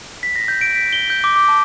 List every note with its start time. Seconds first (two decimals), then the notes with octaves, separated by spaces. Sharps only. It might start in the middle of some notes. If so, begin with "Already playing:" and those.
0.23 B6
0.36 A#6
0.48 G6
0.61 D7
0.76 B6
0.93 G7
1.10 G6
1.24 D6
1.36 D6
1.48 A5